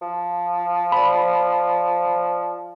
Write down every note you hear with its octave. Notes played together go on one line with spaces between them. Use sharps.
F3
C5 D5 B5